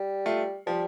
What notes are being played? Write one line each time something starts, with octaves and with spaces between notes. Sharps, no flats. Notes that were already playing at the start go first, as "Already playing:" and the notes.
Already playing: G3
A3 F4
F3 G3